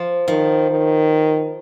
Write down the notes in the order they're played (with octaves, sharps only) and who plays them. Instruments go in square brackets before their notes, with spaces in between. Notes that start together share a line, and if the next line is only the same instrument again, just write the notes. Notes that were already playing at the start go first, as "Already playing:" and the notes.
Already playing: [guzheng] F3
[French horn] D#3 [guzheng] F3
[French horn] D#3